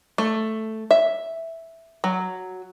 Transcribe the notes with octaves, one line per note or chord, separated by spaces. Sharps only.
A3
E5
F#3